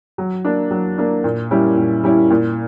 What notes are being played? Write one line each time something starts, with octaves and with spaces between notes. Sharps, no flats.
F#3
A#3 D4
F#3
A#3 D4
A#2
G3 C#4 E4
A#2
G3 C#4 E4
A#2